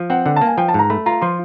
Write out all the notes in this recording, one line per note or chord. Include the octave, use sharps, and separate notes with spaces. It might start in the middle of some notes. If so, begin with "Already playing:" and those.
Already playing: F3
C4 F#5
D3 F#5
A5
A#3
G#5
F3 G5
A5
G#2 A#5
A3 B5
F4 A#5
F3 C6